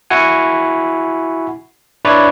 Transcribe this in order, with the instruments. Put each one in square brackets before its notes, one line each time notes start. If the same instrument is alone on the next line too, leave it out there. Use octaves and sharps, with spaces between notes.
[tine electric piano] E4 F#4 F#5 G#5
D4 E4 B4 C#5 D5